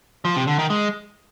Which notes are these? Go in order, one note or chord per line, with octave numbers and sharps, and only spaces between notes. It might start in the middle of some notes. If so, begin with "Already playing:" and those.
F3
C3
D3
D#3
G#3